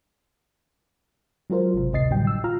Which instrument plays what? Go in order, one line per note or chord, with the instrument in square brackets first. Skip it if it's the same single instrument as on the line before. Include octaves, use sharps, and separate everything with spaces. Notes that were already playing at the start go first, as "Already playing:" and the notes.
[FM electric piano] F#3 G#3 F4 A#4 C5
G#1 C3
A1 D2 C3 D#5 A6 C7
A2 D3 F#3 G3 G5
E6
F4 A#5 F6